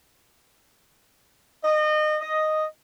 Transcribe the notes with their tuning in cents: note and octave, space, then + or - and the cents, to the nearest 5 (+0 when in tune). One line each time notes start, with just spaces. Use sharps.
D#5 -30
D#5 +0